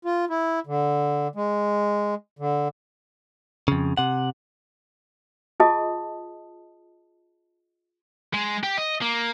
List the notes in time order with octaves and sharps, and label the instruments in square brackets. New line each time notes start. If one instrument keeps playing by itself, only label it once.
[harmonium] F4
E4
D3
G#3
D3
[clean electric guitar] F2 C#3
C3 F#5
[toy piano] F4 G#4 D#5 A5 D#6
[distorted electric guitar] G#3
G4
D#5
A#3